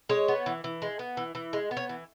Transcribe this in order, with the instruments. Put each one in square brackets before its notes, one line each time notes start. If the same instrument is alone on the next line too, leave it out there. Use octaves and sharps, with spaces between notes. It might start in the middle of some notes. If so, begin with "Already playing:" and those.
[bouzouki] G#3 C#5
B3
E3
E3
G#3
B3
E3
E3
G#3
B3
C#5
E3